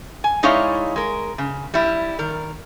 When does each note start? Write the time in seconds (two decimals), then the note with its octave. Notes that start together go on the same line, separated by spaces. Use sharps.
0.24 G#5
0.43 G#3 D#4 E4 C#5 D5 F5
0.96 G#3 A#4
1.38 C#3
1.74 G3 E4
2.19 D#3 A#4